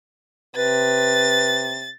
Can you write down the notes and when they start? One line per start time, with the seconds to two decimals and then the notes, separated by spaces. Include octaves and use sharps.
0.56 C3 B4 A6